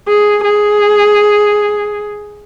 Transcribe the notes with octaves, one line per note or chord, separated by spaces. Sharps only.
G#4
G#4